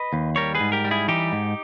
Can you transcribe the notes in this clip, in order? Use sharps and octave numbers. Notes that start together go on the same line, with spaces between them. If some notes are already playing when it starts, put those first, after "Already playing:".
Already playing: B4 D#5
D#2
G3 A#4 C#5
G#4 B4
G#2
G4 A#4
G3
E4 G#4
E3 D#4 G4
G#2